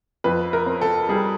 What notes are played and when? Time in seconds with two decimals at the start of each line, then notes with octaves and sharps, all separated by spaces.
0.24 F2 B4
0.53 A#4
0.66 C4
0.81 A4
1.09 G3 G#4